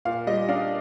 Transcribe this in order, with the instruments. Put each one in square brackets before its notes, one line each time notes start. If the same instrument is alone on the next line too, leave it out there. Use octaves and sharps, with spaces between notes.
[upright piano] A#2 F5
G3 D#5
D4 F5